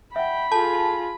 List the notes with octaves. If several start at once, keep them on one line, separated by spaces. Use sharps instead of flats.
E5 F#5 G5 B5
F4 G#4 A4 A5